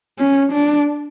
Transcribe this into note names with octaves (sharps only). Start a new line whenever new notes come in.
C#4
D4